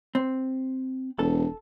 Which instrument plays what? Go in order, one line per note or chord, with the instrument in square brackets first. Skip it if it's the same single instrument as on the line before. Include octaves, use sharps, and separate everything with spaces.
[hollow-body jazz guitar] C4
[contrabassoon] E1 [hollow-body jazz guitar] A4